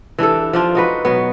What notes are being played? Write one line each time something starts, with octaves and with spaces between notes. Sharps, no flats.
E3 D4 G4 A4
F3 D4 F4
D#4 F#4 B4
B2 F#3 B3